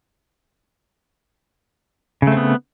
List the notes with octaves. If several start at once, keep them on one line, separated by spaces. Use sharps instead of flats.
C#3 A3 B3 C4